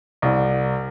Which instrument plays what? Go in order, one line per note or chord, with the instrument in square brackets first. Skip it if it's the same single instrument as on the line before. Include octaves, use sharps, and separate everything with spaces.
[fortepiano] C2